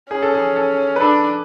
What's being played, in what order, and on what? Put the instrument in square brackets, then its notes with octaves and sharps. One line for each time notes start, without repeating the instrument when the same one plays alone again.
[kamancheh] C#4 [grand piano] G#4
[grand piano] A4
G#4
A4
B4
[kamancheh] D4 [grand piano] A4